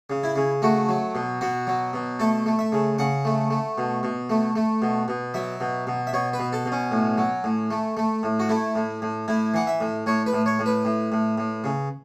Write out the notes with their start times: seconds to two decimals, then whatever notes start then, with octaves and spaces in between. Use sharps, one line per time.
0.10 C#3
0.23 E4
0.36 C#3
0.62 A3 F#4
0.89 F#3
1.15 B2
1.41 B2 F#4
1.67 F#3
1.93 B2
2.19 A3 A4
2.46 A3
2.59 E5
2.72 C#3
2.98 C#3 F#5
3.25 A3
3.50 A3
3.78 B2
4.03 B2
4.30 A3
4.56 A3
4.82 B2
5.08 B2
5.34 F#3 E5
5.60 B2
5.87 B2
6.07 E5
6.13 B2 C#5
6.33 B4
6.39 B2
6.53 A4
6.65 B2
6.72 C#4
6.91 A2
7.18 F#3
7.44 A2
7.71 A3
7.97 A3
8.23 A2
8.40 F#4
8.49 A3 E4
8.76 A2
9.02 A2
9.28 A2 E4
9.54 E3 F#5
9.67 E5
9.81 A2
10.06 A2 C#5
10.26 B4
10.33 A2
10.46 C#5
10.59 A2
10.66 B4
10.85 A2
11.12 A2
11.38 A2
11.64 C#3